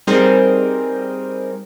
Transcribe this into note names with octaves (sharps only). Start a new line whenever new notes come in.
G3 C4 D#4 G#4 A#4 C5